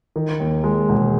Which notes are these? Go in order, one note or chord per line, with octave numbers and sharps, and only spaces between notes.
D#3
D#2
G#3
E1